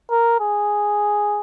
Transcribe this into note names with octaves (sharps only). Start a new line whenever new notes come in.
A#4
G#4